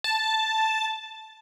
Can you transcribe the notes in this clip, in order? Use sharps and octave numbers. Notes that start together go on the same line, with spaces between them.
A5